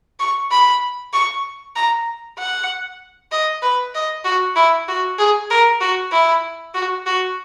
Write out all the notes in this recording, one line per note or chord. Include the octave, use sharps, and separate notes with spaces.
C#6
B5
C#6
A#5
F#5
D#5
B4
D#5
F#4
E4
F#4
G#4
A#4
F#4
E4
F#4
F#4